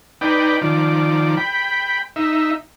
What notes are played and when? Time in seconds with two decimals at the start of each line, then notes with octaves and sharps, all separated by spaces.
0.21 D#4 B4 D5 G5
0.61 D#3 F3 D5
1.37 G5 B5
2.16 D#4 E5